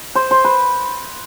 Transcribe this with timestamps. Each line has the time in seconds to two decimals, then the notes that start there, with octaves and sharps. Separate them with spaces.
0.15 C5
0.31 C5
0.45 B4